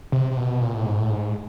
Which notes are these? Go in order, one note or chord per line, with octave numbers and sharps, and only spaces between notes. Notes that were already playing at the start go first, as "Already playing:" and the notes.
C3
C3
B2
A#2
A2
G#2
A2
G#2